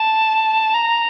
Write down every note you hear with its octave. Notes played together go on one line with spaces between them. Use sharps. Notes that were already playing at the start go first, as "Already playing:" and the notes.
Already playing: A5
A#5